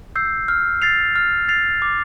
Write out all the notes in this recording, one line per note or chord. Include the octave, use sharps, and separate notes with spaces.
E6 G6 C7
F6
A6 C7 F7
F6
A6 C7 F7
D6